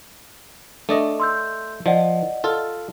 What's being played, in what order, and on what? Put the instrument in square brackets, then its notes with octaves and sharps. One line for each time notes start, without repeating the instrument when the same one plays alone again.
[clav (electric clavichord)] A3 D5 D#5 [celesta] D4
[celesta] C6 E6 G6
[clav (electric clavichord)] F3 [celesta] D5 D#5 F#5
[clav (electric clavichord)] F4 A4